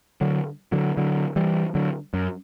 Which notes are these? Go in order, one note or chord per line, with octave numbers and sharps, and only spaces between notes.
D3 F#3
D3 F#3
D3 F#3
E3 G3
D3 F#3
F#2